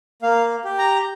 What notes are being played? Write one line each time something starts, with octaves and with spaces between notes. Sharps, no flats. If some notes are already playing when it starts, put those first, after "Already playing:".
A#3 F5
G4
A#5